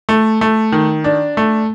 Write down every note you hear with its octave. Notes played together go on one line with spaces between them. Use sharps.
A3
A3
D#3
D4
A3